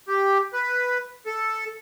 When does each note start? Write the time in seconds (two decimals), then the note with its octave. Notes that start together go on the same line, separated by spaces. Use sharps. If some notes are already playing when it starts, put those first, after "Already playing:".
0.08 G4
0.53 B4
1.26 A4